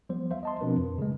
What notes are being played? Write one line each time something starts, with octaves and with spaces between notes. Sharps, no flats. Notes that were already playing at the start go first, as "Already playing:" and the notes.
F3 G3 B3 C5
C5 E5 F5
D#5 A5 C6
B2 F3 C4 D4 A#4 B4
F2
C#3 G#3